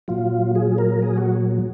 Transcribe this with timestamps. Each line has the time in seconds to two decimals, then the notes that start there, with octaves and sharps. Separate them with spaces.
0.08 A#2 F#3 F4
0.55 G#4
0.78 A#4
1.02 G#4
1.18 F#4